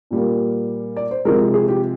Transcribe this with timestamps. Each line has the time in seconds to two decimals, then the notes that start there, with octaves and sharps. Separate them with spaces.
0.11 A#2 G3 A#3
0.97 D5
1.11 C5
1.25 C3 F3 G#3 A#4
1.54 G#4
1.68 G4